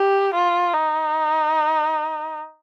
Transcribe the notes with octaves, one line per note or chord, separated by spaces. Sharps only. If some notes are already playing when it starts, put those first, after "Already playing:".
Already playing: G4
F4
D#4